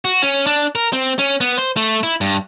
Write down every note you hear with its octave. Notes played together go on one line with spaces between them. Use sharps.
F#4
C#4
D4
A#4
C4
C#4
B3
C5
A3
E4
G2